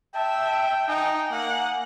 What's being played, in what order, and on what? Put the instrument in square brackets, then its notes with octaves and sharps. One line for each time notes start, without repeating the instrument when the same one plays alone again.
[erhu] E5 [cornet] G5 [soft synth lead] A5
[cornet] D#4 [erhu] G5 [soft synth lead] G#5
[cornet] A#3 [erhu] F#5